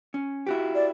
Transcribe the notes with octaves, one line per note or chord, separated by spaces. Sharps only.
C#4
E4 F#4 G4
D5